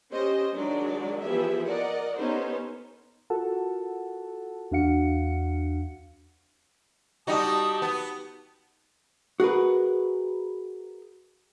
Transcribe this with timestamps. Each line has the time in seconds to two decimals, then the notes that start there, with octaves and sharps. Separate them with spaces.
0.12 C#4 G4 C5 D#5
0.53 D#3 F#3 G#3 D4 D#4 D5
1.21 E3 F3 B3 G4 G#4 E5
1.67 A#4 D5 D#5 F#5
2.17 B3 C#4 D#4 G4 A4 C5
3.30 F4 F#4 A4 A#4 F#5 A5
4.71 E2 D4 F#4 F5 F#5 C#7
7.27 G3 D#4 F#4 A5 D#6
7.82 B3
9.40 F#4 G#4 A#4 B4